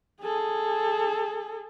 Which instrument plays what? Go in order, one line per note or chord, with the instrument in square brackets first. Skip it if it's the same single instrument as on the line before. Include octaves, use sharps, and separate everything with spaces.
[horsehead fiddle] G#4 A4